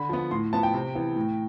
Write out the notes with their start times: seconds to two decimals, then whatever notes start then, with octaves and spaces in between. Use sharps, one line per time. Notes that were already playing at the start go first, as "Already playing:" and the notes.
Already playing: D3 B5
0.09 F3 B3
0.31 A2 C6
0.53 F3 B3 A5
0.63 G5
0.74 C3
0.95 E3 B3
1.16 A2